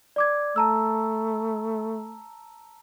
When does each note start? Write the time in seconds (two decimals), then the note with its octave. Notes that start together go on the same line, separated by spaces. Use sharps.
0.16 D5 D6 G#6
0.56 A3 A5 A#5 E6